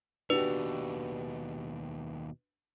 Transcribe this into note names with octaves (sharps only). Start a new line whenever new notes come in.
D#2 B2 D4 F#4 G4 B4